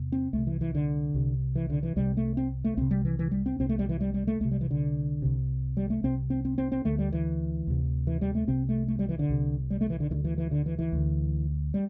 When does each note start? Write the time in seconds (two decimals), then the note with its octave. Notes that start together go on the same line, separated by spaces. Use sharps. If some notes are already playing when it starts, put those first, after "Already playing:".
Already playing: E2 C3
0.12 C4
0.33 C2 C3 A3
0.47 E3
0.61 E3
0.75 D3
1.14 C2 C3
1.55 E3
1.70 D3
1.83 E3
1.96 C2 C3 G3
2.17 A3
2.37 C4
2.64 A3
2.77 C2 C3 C4
2.91 G3
3.05 E3
3.19 E3
3.31 G3
3.46 C4
3.59 C2 C3 C4
3.69 A3
3.79 G3
3.89 E3
4.01 G3
4.14 G3
4.27 A3
4.40 C2 A3
4.45 C3
4.51 G3
4.61 E3
4.71 D3
5.22 C2 C3
5.77 G3
5.90 A3
6.03 C2 C3 C4
6.30 C4
6.45 C4
6.58 C4
6.72 C4
6.85 D2 D3 A3
6.99 G3
7.12 E3
7.67 D2 C3
8.07 E3
8.21 G3
8.35 A3
8.47 C2 C3 C4
8.69 A3
8.88 A3
8.99 G3
9.09 E3
9.19 D3
9.29 C2 C3
9.70 G3
9.81 A3
9.90 E3
10.00 D3
10.11 D2 E3
10.15 D3
10.24 E3
10.38 E3
10.51 D3
10.66 E3
10.79 E3
10.92 D2 D3
11.74 G3